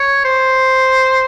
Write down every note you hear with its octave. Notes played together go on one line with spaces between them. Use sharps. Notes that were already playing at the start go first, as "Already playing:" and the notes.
Already playing: C#5
C5